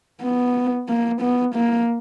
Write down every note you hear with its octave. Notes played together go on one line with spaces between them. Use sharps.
B3
A#3
B3
A#3